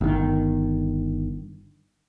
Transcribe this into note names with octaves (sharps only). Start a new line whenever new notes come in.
G1 D#3